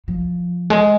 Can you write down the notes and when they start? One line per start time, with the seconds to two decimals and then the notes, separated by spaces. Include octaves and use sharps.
0.08 F3
0.70 G#3